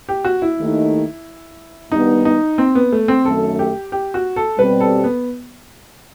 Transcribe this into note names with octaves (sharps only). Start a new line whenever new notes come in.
G4
F#4
E4
D#2 D#3 A3 D#4
G2 D#3 G3 B3 D#4
D#4
C4
B3
A3
C4
F#2 D#3 A3 A4
G4
G4
F#4
A4
B2 G3 C4 B4
A4
B3